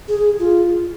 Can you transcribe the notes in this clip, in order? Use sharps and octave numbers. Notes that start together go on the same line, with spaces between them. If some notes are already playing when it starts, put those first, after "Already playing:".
G#4
F4